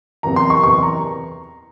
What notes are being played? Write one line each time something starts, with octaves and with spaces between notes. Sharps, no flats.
F#1 E2 C3 A#5
C6
C#6
F#1 E2 C3 C#6
A#5